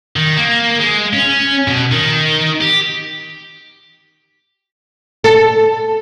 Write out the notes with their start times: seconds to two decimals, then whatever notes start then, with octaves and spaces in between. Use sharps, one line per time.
0.16 D#3
0.37 A#3
0.80 G#3
1.13 C#4
1.68 B2
1.92 D#3
2.61 G4
5.24 A4